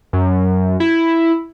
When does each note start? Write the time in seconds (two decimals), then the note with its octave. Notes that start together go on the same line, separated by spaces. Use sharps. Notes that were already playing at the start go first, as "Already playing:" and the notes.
0.13 F#2
0.80 E4